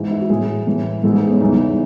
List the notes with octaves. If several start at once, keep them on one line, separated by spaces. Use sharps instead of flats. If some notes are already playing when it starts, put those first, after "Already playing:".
Already playing: G#2 E3
E4
F#4
A2 E3 G#4
A2 E3
G#2 E3 A4
G#4
B3
C#4
E2 C#3 E3 D#4